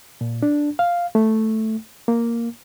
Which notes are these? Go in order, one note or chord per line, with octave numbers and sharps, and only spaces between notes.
A#2
D4
F5
A3
A#3